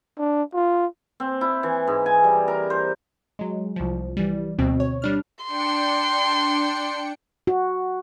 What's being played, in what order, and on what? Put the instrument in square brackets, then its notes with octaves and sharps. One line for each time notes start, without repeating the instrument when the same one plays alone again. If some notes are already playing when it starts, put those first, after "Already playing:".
[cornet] D4
F4
[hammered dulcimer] C4
E4
E3
G#2
G#5
G3
A#4
C5
[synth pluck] F#3 G#3
C2 F3
E3 G3
D2 B2 C4
C#5
G3 D4 F6
[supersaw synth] D4 G5 C#7 [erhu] C6
[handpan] F#4